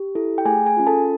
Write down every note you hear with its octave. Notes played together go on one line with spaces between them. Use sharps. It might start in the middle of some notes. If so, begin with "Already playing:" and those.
Already playing: G4
E4 A4
G5
A3 G#4 G#5
G#4 G#5
C#4 F4
A4 A5